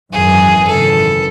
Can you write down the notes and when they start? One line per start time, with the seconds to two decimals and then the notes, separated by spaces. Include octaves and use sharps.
0.12 G#1 F#2 E3 G#4
0.66 G#1 F#2 C#3 E3 A4